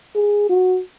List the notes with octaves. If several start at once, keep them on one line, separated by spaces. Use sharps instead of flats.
G#4
F#4